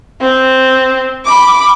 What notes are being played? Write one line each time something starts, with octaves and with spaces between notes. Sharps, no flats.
C4
B5 D6